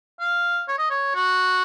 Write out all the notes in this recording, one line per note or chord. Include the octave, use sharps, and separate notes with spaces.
F5
C#5
D#5
C#5
F#4